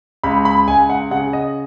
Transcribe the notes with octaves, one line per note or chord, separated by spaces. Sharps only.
C#2 B5
B5
C#2 G#5
F#5
C#3 F#5
D#5